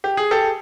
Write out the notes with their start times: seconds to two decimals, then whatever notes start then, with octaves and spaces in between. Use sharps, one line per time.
0.04 G4
0.17 G#4
0.31 G4 A4